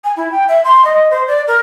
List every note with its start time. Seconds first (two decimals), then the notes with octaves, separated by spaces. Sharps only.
0.04 G#5
0.17 E4
0.32 G5
0.48 E5
0.65 C6
0.85 D#5
1.11 C5
1.28 D5
1.48 A#4